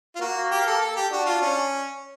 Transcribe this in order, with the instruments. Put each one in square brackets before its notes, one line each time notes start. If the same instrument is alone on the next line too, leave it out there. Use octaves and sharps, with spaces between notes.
[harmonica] F4
[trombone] A#3 [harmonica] F#4
[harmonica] G4
A4
A4
G4
[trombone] D4 [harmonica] F#4
[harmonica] F4
C#4